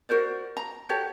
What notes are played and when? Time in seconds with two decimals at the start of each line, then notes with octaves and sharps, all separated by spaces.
0.09 F#4 A#4 C5 D5
0.57 A#5
0.89 F#4 G4 A4 C#5